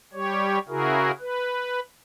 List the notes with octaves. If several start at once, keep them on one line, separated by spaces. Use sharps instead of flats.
G3 G4 C#5
C#3 E4 F#4 G#4 A#4
B4